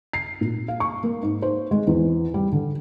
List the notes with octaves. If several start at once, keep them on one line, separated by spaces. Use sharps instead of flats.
C7
A#2
F5
C#6
A#3
G#2
C5
G#3
E2
G3
D3